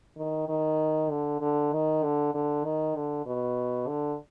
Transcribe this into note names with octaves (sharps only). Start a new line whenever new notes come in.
D#3
D#3
D3
D3
D#3
D3
D3
D#3
D3
B2
D3